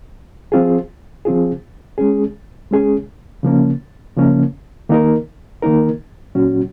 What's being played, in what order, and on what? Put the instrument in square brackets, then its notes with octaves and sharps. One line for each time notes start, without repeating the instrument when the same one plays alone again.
[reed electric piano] F3 C4 F4 G#4
F3 C4 F4 G#4
G#3 C#4 G#4
G#3 C#4 G#4
C#3 F3 A#3 C#4
C#3 F3 A#3 C#4
D#3 A#3 D#4 A#4
D#3 A#3 D#4 A#4
A#2 F#3 C#4 F#4